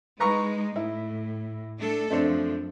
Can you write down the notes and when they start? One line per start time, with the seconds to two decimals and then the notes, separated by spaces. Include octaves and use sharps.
0.20 G#3 D#4 B4 A#5 C#6
0.76 A2 E4
1.77 A3 D4 A4
2.10 F#2 F3 A3 C4 D4